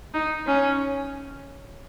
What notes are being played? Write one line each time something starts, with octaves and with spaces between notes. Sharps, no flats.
D#4
C#4